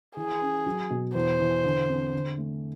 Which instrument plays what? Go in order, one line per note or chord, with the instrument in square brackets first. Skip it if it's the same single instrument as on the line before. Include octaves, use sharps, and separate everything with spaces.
[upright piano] E3 [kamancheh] G#4
[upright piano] C#4
F#3
B2
[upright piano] E2 [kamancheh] C5
[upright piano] E3
D3
C4
D3
A3